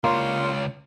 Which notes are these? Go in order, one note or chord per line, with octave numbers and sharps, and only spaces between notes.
C#2 G3 A#3 D4 F4 C#5 C6